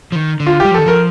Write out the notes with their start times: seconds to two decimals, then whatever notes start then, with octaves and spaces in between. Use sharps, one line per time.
0.12 F3
0.16 D#3
0.40 D3
0.47 F4
0.60 G3 G4
0.71 F3
0.74 D#3 A4
0.86 F3 A#4